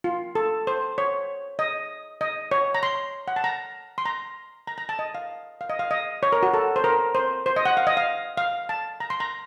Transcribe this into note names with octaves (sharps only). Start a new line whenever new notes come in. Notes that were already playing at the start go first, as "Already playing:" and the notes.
F4
A4
C5
C#5
D#5
D#5
C#5
A#5
C6
F#5
A5
A#5
C6
A#5
A#5
A#5
A5
D#5
F5
F5
D#5
F5
D#5
C#5
A#4
F#4
A4
C5
A#4
C5
C5
D#5
F#5
F5
D#5
F5
F5
A5
A#5
C6
A#5